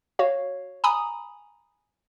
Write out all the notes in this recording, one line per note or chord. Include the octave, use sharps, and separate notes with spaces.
F#4 C#5 F5
G#5 A#5 B5 D#6